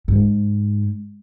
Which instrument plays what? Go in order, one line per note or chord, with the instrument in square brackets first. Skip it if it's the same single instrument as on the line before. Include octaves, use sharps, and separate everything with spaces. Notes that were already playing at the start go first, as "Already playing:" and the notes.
[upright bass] G#2